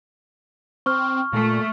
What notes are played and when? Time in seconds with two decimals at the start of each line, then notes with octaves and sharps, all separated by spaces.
0.86 C4 C#6 F6
1.33 A#2 A3